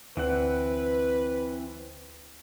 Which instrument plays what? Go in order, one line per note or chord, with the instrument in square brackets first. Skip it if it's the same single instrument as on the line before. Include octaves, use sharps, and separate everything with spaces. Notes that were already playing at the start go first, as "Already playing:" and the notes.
[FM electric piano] D2 [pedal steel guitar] E3 C4 F#5 [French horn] B4